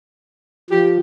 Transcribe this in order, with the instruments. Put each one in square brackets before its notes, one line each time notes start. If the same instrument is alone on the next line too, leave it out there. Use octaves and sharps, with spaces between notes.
[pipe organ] F3 [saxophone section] G4